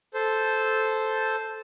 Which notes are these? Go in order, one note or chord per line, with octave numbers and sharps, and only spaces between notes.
A4 C5